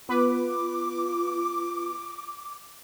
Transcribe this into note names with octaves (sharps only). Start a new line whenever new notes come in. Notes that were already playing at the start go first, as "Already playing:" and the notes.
B3 F4 B4 D6